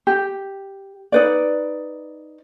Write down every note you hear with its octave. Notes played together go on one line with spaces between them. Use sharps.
G4
D#4 B4 D5